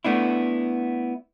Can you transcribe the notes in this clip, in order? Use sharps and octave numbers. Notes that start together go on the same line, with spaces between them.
A3 B3 D4 E4